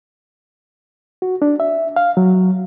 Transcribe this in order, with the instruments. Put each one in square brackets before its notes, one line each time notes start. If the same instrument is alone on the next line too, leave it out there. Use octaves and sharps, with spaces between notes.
[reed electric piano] F#4
D4
E5
F5
F#3